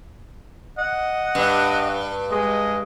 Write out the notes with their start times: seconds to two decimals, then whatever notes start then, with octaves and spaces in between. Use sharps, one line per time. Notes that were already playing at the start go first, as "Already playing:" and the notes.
0.78 D#5 F#5
1.35 G2
2.31 G#3 D#5